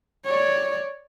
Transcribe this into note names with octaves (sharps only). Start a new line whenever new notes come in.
C#5 D5